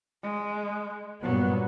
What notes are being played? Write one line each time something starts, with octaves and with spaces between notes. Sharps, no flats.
G#3
G2 A#2 F#3 B3